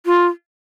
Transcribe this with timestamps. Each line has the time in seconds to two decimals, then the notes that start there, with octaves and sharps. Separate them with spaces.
0.06 F4